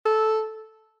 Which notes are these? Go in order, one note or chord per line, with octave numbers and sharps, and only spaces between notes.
A4